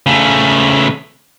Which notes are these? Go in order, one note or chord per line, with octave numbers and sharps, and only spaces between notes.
C#3 A3